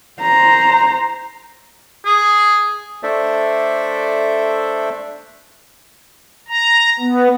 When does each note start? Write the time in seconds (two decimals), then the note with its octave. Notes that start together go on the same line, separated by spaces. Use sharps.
0.20 C5 A#5
2.05 G#4
3.03 A3 D4 A4 C5 D5 E5
6.49 A#5
7.00 B3